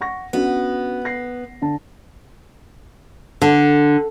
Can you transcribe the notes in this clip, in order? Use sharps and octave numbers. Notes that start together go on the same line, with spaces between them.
F#5 C#6 A#6
B3 C#4 D4 F#4
A#6 C7
D3 A5
D3